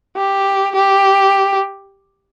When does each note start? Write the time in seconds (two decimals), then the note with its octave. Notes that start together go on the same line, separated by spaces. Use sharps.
0.17 G4
0.76 G4